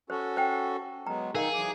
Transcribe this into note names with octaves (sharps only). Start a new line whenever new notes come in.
C#4 F#4 A4 C5
C5 G5
F#3 G#3 B3 A#5
D#3 D#4 G#4 A#4 F5
E3 F#3 D6